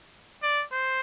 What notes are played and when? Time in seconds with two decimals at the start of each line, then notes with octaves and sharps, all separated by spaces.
0.43 D5
0.72 C5